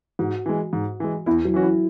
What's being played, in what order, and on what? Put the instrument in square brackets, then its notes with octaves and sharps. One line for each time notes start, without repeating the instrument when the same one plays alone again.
[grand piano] G#2 [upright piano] F#4
[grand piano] E3 G#3
G#2
E3 G#3
[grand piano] E2 [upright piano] E4
[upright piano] F#3
[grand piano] E3 C#4 F#4
[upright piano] E4